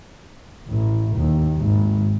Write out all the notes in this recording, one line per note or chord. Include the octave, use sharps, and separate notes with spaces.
A1
D#2
G#1